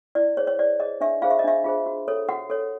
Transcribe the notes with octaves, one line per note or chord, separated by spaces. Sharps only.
E4 D5
G#4 C5 C#5
C#5
E4 D5
G#4 C5 D#5
D4 E5
F4 G#4 C5 F5
E5
D#5
D4 E5
F4 G#4 C5
F#4
A4 C#5
F#4 F#5
A4 C#5